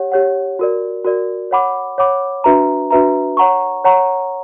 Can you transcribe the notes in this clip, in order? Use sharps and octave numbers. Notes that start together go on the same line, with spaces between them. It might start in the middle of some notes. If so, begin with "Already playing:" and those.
Already playing: G4 C#5 F#5
G4 C#5 F#5
F#4 A#4 D5
F#4 A#4 D5
C#5 F#5 B5 D6
C#5 F#5 B5 D6
D4 F#4 B4 E5 A#5
D4 F#4 B4 E5 A#5
C#5 F#5 A#5 C#6
C#5 F#5 A#5 C#6